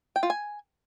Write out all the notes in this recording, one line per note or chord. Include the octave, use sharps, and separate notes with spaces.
G5
F4
G#5